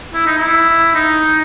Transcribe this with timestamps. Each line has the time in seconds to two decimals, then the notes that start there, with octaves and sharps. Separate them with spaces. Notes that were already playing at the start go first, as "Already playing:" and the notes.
0.14 E4
0.26 D#4
0.38 E4
0.95 D#4